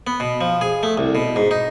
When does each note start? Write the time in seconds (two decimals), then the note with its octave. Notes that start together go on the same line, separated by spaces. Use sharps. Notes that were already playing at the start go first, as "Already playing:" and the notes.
0.07 B3
0.20 B2
0.41 F3
0.61 G#4
0.83 A3
0.98 C2
1.15 B2
1.36 G#2
1.51 D#4